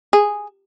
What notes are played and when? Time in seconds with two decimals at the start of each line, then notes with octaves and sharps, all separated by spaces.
0.13 G#4